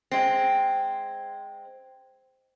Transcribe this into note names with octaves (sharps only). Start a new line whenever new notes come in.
G#3 C4